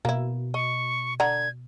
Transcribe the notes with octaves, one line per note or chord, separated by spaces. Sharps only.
B2 A#3 E4
D#5 C#6
D3 F#5 A#5 G#6